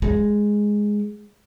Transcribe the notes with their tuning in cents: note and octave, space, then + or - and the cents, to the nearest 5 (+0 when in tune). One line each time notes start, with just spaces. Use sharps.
G#3 +0